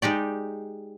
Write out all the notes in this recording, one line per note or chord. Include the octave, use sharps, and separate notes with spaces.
G#3 D#4 G4 D5